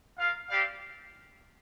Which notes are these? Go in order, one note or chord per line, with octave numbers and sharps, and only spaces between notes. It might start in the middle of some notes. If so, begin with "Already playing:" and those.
F4 A#4 F5
G3 C4 G4 D5 F5